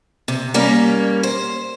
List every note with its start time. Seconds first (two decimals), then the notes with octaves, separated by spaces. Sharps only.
0.28 C3
0.54 G3 A#3 C#4 A#4
1.23 C5